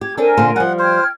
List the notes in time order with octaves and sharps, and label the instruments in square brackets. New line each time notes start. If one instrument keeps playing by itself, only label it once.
[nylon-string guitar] G4 [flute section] G#6
[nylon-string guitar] C4 D4 A4 [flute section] A#4 G#5
[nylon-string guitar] A#2 D3 C5
[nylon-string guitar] F3 G3 [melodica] F#5
[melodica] C5 [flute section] G5 F6 G#6